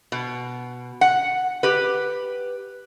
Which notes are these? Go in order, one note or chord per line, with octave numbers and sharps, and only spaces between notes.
B2
F#5
G4 B4